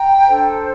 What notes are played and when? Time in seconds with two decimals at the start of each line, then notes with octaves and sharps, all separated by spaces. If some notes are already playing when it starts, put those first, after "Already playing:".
Already playing: G5 A#5
0.27 D4 A4 C5